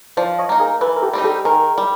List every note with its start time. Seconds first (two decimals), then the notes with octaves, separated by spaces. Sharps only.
0.17 F3 C5 D5
0.38 C#5 D#5
0.49 A#3 D#4
0.60 G#4 A#4
0.81 E3 A4 B4
0.96 A#4
1.02 G4 A4
1.13 G3 C4 D#4
1.24 G4 A4
1.45 D#3 G#4 A#4
1.78 G3